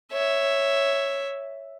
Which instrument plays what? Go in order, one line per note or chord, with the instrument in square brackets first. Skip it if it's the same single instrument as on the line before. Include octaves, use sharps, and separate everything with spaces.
[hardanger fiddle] C#5 E5